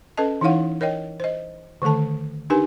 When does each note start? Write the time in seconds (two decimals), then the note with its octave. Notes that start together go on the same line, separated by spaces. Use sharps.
0.17 C#4 A4 B4 D#5 A5
0.41 E3 D#4 E4 C#5 F5 F#5
0.81 A#4 C#5 D#5 G5
1.20 C5 D#5
1.82 D3 D#3 A3 A4 A5
2.50 D4 D#4 G4 A#4 B4 G#5